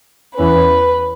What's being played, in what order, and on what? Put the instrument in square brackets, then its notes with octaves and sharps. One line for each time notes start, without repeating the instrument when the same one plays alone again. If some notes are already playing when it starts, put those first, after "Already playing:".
[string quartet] E2 E3 C#4 B4